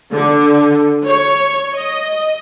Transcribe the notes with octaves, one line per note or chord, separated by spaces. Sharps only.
D3
C#5
D#5